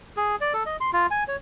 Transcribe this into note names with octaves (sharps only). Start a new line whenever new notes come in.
G#4
D5
A4
D#5
C6
F4
G#5
C#5